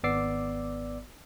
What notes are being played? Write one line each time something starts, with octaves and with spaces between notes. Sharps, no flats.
G#1 B3 D5 D6 E6 C7